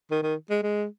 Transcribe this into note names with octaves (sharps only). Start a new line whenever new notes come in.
D#3
D#3
G#3
G#3